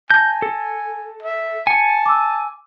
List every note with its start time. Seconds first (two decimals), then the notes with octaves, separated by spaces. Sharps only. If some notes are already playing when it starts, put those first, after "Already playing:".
0.10 G#5 A5 G6 A#6
0.42 A4
1.23 E5
1.67 G#5 A5 C#7
2.06 D6 E6